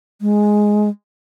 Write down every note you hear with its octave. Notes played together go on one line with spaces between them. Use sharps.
G#3